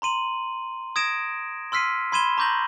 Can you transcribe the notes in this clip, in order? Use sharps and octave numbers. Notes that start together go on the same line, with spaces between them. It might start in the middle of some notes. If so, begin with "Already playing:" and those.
A#5 C6 D#7 F#7
D#6 G#6 A#6 D7 E7
C6 E6 F6 B6 C7 D#7
B5 C6 G#6 D#7 E7 G7
A#5 C#6 D6 G6 A#6 F#7